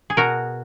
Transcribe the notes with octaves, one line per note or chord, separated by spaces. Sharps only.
G#4
B2 F#4 A#4